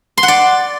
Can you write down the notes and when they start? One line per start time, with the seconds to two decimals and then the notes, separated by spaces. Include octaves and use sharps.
0.18 C6
0.23 F#5
0.28 D5